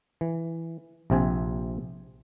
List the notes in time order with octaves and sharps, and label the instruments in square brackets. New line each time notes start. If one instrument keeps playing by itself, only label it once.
[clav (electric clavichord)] E3
A#1 C3 C4 G#5